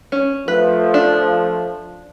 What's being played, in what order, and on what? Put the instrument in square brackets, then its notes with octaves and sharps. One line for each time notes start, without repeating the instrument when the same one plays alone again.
[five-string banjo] C#4
[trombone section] F3 A3 [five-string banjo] B4
[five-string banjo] D4